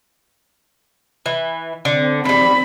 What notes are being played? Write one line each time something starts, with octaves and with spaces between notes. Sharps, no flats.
E3
D3 C4
E3 G3 B5